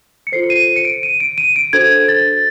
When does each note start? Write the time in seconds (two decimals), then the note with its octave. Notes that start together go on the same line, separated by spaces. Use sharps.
0.27 C#7
0.32 F4 A4 C5 C7
0.50 D#7
0.67 D#7
0.76 C#7
0.85 D7
1.03 D#7
1.20 D7
1.38 D#7
1.56 D7
1.73 D4 F#4 A4 C5 G#6
2.08 A6